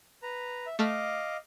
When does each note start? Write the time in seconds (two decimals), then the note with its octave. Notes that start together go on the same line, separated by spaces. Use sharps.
0.23 B4 A#5
0.66 E5
0.79 A3 A4 D#5 F5 D6 F6